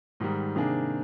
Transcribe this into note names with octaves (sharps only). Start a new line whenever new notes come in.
G#2 D#3 G3
C3 D#3 A#3 D4 G#4